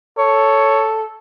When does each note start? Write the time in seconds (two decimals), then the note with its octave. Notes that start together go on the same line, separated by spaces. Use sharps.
0.18 A4 C#5